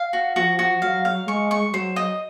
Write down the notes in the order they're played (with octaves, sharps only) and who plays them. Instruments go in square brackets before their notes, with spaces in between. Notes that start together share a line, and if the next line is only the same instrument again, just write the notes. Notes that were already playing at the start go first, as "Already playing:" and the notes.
Already playing: [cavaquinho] F5
F#4
[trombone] F3 [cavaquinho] F#4
[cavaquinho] F#4
[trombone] F#3 [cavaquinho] F5
[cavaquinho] F5
[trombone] G#3 [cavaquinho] C#6
[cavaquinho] C#6
[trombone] F#3 [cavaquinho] C5
[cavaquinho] D#5